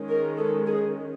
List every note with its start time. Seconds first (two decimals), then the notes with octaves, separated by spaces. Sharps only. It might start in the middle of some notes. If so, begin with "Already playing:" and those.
Already playing: D#3 G#3 C#4
0.10 A#4
0.38 A4
0.67 G#4